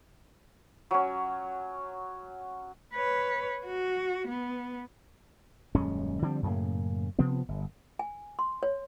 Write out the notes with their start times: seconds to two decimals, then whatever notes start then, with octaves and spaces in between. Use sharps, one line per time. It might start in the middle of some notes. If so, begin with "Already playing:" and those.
0.91 F#3 C#4
2.94 B4 C#5
3.66 F#4
4.27 B3
5.75 D#1 F#2 G#3 C#4
6.22 D3 F3 G3 C4
6.43 F#2 A2 C#3 A#3
7.19 C3 F3 B3 C4
7.49 G1
7.99 G#5
8.39 C6
8.63 C#5